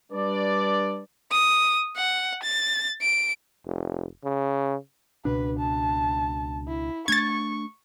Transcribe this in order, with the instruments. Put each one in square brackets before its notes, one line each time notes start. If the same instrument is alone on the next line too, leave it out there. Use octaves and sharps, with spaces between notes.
[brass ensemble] G3 D4 B4 D5
[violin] D#6
F#5
A6
D7
[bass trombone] F1
C#3
[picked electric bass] C#2 B2 D4 [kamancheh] B4
[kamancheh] A5
E4
[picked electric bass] A3 D4 [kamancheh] C#6 [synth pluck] G#6 A6